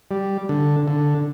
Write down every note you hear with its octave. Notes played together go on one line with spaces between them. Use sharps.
G3
D3
D3